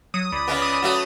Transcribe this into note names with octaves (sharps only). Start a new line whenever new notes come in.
F#3 D#6
C#2 D5 B5
C#3 G#3 B3
D#6
F#3 A3 F#4